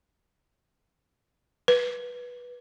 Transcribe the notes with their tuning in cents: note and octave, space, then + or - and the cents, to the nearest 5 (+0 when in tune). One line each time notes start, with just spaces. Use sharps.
B4 -15